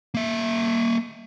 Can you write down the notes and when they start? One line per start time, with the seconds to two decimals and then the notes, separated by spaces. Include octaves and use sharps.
0.14 A#3 E5